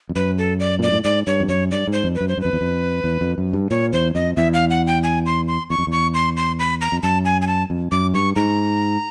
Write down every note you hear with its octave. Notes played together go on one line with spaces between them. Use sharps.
F2
F#2 B4
A4
D5
A#2 D5
A2
G#2 D5
G2 C#5
F2
F#2 C#5
G2 D5
G#2
C5
F2
B4
F#2
C5
F#2
F2 B4
E2
F2
E2
F2
F#2
G2
A#2 C#5
E2 C5
F2 D#5
E2 E5
F5
F#5
G5
G#5
C6
C6
E2 C#6
F2
E2 C#6
C6
C6
B5
A#5
F2
F#2 A5
G#5
G#5
A5
F2
F#2 D6
G2 C#6
G#2 A#5